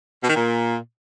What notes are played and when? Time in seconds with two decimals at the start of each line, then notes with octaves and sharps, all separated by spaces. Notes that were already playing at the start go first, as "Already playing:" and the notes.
0.23 B2
0.29 D#3
0.35 A#2